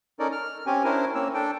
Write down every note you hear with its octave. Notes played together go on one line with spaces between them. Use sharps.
C#4 D#4 A4 A#4 D5
F6
C4 C#4 G4 G#5
C#4 D4 E4 A#4 C5
A#3 C4 C#4 C#5 E6
D4 A4 G5